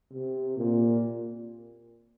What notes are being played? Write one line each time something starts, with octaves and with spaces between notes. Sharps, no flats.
C3
A#2